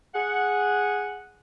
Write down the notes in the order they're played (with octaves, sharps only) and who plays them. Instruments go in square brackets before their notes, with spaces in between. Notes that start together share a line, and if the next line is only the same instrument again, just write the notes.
[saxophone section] G#4 F#5